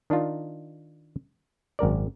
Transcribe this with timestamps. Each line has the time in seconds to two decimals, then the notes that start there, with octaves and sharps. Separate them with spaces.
0.10 D#3 D4 D#4 F4
1.79 G#1 F#2 A#4 D5